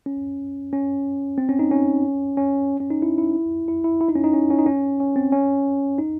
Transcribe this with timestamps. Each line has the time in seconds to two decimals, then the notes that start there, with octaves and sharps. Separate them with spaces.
0.06 C#4
0.73 C#4
1.38 C4
1.49 C#4
1.59 D#4
1.71 C#4
2.37 C#4
2.80 C#4
2.91 D#4
3.02 E4
3.18 E4
3.68 E4
3.84 E4
4.01 E4
4.09 D#4
4.15 C#4
4.24 D#4
4.33 C#4
4.50 C#4
4.58 D#4
4.66 C#4
5.00 C#4
5.16 C4
5.32 C#4
5.98 D#4